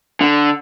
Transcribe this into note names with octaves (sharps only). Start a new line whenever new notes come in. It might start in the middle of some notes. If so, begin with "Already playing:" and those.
D3